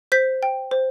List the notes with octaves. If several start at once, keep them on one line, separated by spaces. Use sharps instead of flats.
C5 G6 B6
G5
C5